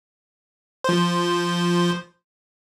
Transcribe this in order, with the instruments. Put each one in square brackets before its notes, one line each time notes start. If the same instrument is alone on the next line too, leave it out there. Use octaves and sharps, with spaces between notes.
[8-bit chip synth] F3 C5